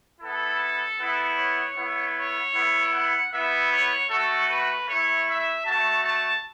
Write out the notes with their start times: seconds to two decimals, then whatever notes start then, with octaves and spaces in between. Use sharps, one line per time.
0.21 B3 E4 A4
0.98 B3 E4
1.37 C#5
1.76 B3 E4
2.15 C#5
2.54 B3 E4
2.93 F#5
3.32 B3 E4 E5
3.71 C#5
4.09 A3 F#4 A4
4.48 B4
4.87 A3 E4 C#5
5.26 E5
5.65 A3 F#4 A5
6.04 A5